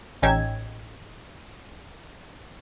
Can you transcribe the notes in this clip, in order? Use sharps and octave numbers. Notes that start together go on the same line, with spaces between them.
A1 C#4 D#4 G4 E6 G#6